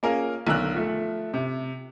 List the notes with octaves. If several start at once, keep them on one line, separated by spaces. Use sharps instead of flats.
A#3 C#4 F4 G#4 A#4
B1 D3 A#4 E6 F#6
F3 A3
C3